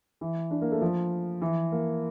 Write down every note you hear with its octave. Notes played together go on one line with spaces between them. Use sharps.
E3
D4
A#3
A3
F3
E3
A#3